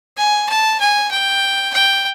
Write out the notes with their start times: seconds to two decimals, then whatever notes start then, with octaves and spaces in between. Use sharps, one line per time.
0.17 G#5
0.49 A5
0.80 G#5
1.10 G5
1.73 G5